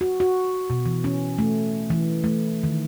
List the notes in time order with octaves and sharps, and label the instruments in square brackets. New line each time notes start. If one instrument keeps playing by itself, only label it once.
[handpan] F#4
F#4
B2
E3
C#4
A3
E3
A3
D#3